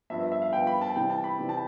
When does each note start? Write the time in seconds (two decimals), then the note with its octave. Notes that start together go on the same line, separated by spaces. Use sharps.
0.10 G2 F3 B3 E5
0.21 E5
0.32 E5
0.42 F5
0.53 G2 F3 B3 G5
0.67 B5
0.81 A5
0.95 C3 E3 G3 G5
1.10 A5
1.24 B5
1.38 C3 E3 G3
1.49 A5